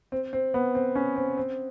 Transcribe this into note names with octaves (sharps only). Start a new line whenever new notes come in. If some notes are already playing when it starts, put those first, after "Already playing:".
C4
C4
B3
C4
C#4
C4
C4